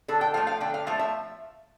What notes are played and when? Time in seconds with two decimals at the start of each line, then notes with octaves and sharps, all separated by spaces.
0.08 D3 A4
0.21 G5
0.34 F3 A3 F5
0.47 F5
0.60 D3 G5
0.74 F5
0.87 F3 A3 F5
0.99 E5